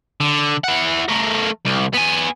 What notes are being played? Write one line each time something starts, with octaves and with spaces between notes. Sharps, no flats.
D3
E4 F#5
A3 A#4
C2
B3 G#5